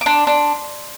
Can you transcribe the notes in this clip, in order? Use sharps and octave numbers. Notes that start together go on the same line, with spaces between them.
D6
D4 C6
D4